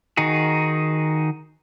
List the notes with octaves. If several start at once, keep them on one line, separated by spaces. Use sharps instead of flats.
D#3 D#4 F#4 G#4